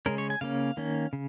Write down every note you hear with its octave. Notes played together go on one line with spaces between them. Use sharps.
C#3 G#3 C#4 A#4
C#5
G#5
C#3 A#3 C#4 F5
D#3 A#3 C#4
C#3